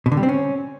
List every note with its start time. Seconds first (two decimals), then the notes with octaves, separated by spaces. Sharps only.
0.06 B2
0.12 D3
0.17 G3
0.23 C4
0.29 C#4